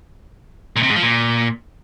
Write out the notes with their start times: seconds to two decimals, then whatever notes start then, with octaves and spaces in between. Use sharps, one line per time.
0.76 A#2
0.83 C3
0.89 G#2
0.96 F3
1.02 A#2